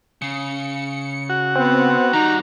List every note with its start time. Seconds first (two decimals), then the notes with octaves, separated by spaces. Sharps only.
0.22 C#3 C#7
1.29 F#4
1.55 B3 C4
2.13 D#3 G3 D#4 A#5